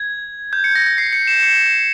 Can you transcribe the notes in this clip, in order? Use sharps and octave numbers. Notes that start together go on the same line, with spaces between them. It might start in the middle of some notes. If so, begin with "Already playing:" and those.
Already playing: G#6
G6
C#7
A#6
A#6
C7
C#7
E7
C#7